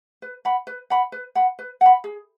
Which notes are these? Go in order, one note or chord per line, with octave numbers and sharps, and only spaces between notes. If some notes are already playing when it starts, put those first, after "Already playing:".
B4
F#5 B5
B4
F#5 B5
B4
F#5 B5
B4
F#5 B5
G#4